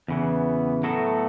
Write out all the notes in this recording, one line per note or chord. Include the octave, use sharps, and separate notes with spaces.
E2 C#3 E3 B3
A2 F#3 A3 B3 F#4 A4